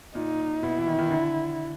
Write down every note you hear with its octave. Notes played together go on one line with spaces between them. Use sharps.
A#2 D#4
B2 E4
E3
D#3
D#3
D3